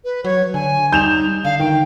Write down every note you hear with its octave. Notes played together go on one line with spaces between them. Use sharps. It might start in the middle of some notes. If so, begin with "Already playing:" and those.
B4
F#3 C#5
D3 G#5
G3 D#4 G6 E7 F7
D3 F5
D#3 G5